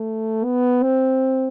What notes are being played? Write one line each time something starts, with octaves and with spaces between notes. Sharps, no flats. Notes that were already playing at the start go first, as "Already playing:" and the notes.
Already playing: A3
B3
C4